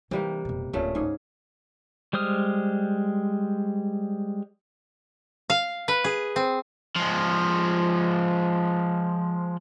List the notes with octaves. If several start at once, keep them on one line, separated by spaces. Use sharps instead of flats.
C3 E3 G3 A#3 D#4
F1 B2
D1 A#2 C#3 A3
G#2 G#4
G3 G#3 C5 D#6 F6
F5
B4
G#4
C4
F3 G#3